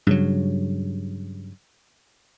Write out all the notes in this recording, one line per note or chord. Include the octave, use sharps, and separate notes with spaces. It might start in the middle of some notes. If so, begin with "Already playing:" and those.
G2 C#3 F#3